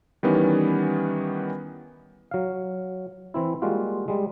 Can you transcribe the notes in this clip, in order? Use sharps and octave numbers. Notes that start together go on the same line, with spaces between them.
D#3 E3 G3 B3 C#4
F#3 F5
E3 C4 E4
G3 G#3 A#3 F4 F#4
G3 G#3